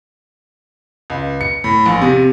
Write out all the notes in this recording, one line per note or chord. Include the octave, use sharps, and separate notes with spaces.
C#2
C#7
A2
A#1
C3